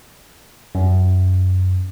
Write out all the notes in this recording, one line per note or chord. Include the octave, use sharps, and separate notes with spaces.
F#2